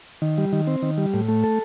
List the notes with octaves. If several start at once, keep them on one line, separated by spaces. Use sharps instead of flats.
D#3
G3
D#3
C4
D#3
G3
A2
A3
A4